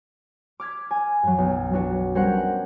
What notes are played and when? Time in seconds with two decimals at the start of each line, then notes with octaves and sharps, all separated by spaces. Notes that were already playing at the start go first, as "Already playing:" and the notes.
0.60 D6 F6 G#6 B6
0.91 G#5
1.23 F#2 F#3
1.38 B1
1.73 F#3 D4 F#4 B4
2.15 G3 C#4 A#4 C5 F#5